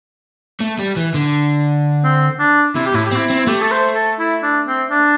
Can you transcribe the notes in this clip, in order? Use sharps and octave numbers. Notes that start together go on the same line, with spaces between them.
A3
G3
E3
D3
C4
D4
C3 E4
G4
A2 E4
G4
C4 E4
C4
E4
A3 G4
A4
C5
A4
E4
D4
C4
D4